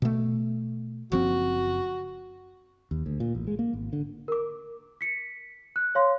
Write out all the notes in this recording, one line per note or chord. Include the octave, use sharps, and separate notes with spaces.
B2 A3
F#1 F3 C4 F#4
D#2
D2
A#2
A1
G#3
A#3
G#1
D3
A#4 D6
B6 C#7
F#6
C#5 F5 C6